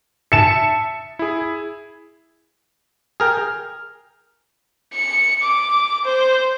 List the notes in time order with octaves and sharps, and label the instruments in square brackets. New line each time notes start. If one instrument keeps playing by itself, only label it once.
[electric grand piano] E5 A5 [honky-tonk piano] C#7 E7
[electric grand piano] E4 G#4
[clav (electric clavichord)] G#4 A#4 G5 [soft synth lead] F6
[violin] C#7
D6
C5